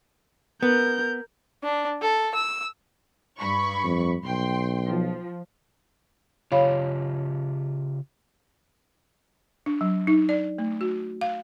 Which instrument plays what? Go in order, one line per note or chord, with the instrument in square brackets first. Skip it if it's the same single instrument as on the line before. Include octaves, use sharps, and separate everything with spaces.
[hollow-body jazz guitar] B3 [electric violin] A#4 G6
[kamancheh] D4
A4
E6
[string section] G2 B5 C#6
[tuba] F2
[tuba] B1 [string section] G5 C6
[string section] F3
[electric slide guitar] C#3 F4 G4 [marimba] C#5 F5 B5
[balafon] D4
F#3
D#4
D5
A3
F#4
F5